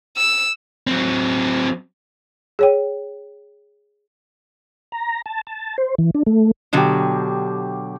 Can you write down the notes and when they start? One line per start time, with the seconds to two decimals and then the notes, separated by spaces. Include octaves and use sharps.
0.17 E6
0.87 F#3 C4
2.59 G#4 C#5 G5
4.92 A#5
5.26 A5
5.47 A5
5.78 C5
5.98 E3
6.15 D4
6.27 A3
6.73 B2 D3 F#3 G4 F5